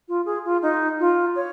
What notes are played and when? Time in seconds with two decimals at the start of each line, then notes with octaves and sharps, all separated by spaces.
0.08 F4
0.26 G#4
0.45 F4
0.62 D#4
1.00 F4
1.36 C#5